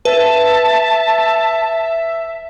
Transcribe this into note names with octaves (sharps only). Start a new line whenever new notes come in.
B4 E5 A5